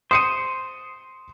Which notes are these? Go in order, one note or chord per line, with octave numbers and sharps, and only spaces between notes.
C5 D#6 C#7 D#7